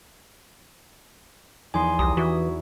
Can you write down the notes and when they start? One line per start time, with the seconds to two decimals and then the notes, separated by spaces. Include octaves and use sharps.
1.74 E2 F3 D#4 G#5 C6
1.99 C2 G4 A#5 D#6
2.17 E3 E4 F#4 E5